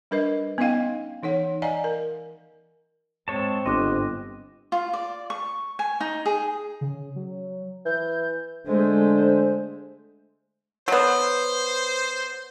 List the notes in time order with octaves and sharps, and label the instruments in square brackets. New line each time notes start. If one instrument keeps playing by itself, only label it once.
[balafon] G3 D4 A#4 B4 D#5
B3 C#4 D#4 D#5 F5 G5
E3 D#4 C#5 F#5
D5 D#5 F5 F#5 G#5 A#5
A#4
[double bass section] G#2 C4 [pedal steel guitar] G#3 C#5 A5
[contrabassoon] G1 [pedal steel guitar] D#5 [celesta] C6 D6 F#6
[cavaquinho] F4
D5
C#6
G#5
D#4
G#4
[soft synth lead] C#3
F#3
[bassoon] E3 [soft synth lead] G6
[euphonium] D3 [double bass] G#3 A3 [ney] C5
[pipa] F#3 B3 [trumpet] C5